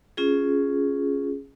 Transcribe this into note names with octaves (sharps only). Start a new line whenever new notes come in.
C#4 F4 G#4